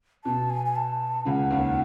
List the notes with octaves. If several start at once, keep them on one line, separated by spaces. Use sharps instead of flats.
B2 A5
G#5
G#5
A5
C#2 C#3 F#5
D#2 D#3